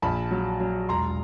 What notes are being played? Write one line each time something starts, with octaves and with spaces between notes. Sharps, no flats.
A#1 A5 B5
F#3
F#3
E1 A#5 C6